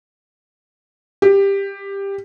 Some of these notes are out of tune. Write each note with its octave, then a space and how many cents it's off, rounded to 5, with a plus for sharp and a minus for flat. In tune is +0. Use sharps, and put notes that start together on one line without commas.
G4 +15